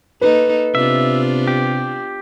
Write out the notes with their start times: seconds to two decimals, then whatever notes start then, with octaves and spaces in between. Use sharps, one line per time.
0.21 A#3 D#4 A4 B4
0.75 C3 B3 D4 F4 E5
1.47 G4